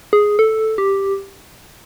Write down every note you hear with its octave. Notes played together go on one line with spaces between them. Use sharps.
G#4
A4
G4